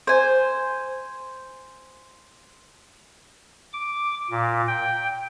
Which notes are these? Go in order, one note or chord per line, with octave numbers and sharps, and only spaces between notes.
C5 G#5
D6
A#2
G5